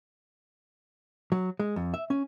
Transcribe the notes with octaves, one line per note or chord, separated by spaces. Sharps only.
F#3
G#3
F2
E5
C#4